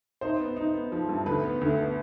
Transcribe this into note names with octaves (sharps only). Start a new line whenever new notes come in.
D#4 C5
B3
D#4
B3
F3
G2
D2 B4
B3
D2
B3